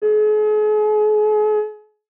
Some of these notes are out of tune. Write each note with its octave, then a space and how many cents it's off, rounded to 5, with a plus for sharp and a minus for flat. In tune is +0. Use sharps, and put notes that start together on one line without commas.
G#4 +40